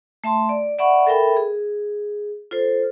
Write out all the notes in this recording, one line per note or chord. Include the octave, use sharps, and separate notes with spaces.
A3 E5 A5 C6
D5
D5 E5 F#5 B5 C#6
A4 A#4 E5 G5 B5
G#4
F4 A4 C5